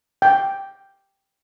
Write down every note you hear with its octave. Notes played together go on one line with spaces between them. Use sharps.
G5